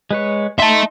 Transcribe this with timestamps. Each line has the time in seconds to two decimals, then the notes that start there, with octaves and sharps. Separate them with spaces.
0.11 G#3 B4 C#5
0.59 D#4 E5 A5 C6